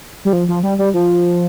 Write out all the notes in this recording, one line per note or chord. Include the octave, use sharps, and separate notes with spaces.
G3
F3
F3
G3
G3
F3